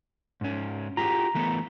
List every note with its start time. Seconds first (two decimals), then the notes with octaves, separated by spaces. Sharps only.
0.41 G#2 C#4
0.97 F4 G4 G#4 A#5
1.35 E3 A3 B3